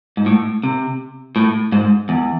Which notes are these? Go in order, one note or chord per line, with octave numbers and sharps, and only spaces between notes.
G#2
A2
C3
A2
G#2
E2